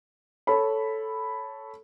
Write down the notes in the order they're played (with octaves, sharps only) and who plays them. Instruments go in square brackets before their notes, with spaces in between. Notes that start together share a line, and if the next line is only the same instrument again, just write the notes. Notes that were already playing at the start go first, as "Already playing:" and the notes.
[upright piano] A4 C#5 B5